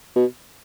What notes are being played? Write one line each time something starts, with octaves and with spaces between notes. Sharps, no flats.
B2